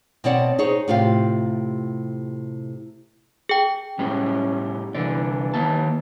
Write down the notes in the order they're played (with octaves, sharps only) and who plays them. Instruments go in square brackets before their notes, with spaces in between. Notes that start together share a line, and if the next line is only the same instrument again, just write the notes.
[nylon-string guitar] B2 C4 C#5 D5 F#5 A5
D#4 G#4 C5 C#5
A2 C3 F4 G4 F5
[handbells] G#4 G5
[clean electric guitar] A2 G3 G#3 [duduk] C#4
[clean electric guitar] C2 D3 D5 [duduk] E3
[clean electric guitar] D#3 A#3 A5